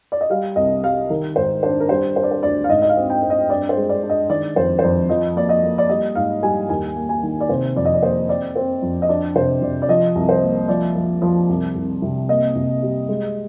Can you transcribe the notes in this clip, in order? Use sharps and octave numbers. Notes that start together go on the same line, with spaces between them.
D5
D#5
G3 F5
C2 D#5
G3 F5
D#3 A#4
G#2 C5
D4 C5
A#4
G3 C5
D4 C5
D5
C5
D2 D5
F5
G#2 D#5
D#5
F5
C4
G5
C4
D#5
G2 D5
C5
G#3
D5
D4
D#5
D#3 D5
F2 C5
C5
F2 D5
F3 D#5
A#3 D5
D#5
A#3
D5
G3 D#5
G#2 F5
G3 G#5
D#2 G#5
A#3
G#5
D#3
D5
C3 C5
F2 D5
D#5
D5
A#3 C5
C4 D5
C4 C5
F2
D#5
D4 D5
C3 C5
C3 D5
D5
F3 D#5
C2
C5
A#3
F3 D5
F3
F3
C2
C2
C3
A#3 D#5
C3
G3
G#3